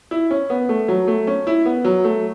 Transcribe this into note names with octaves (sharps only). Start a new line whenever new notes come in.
E4
C#4
B3
A3
F#3
A3
C#4
E4
B3
F#3
A3